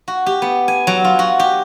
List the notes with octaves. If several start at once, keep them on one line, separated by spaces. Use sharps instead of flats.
F#4
G4
B3
G#5
F#3
F4
F#4
G4